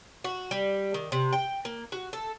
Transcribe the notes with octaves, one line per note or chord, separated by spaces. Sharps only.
F#4
G3
D#3
C3
G5
A#3
F#4
A4